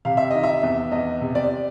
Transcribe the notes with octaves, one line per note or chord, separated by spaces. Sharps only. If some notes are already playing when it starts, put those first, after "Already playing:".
C3 F5
E5
D#3 D#5
E5
E2
E2 D#5
C3
D5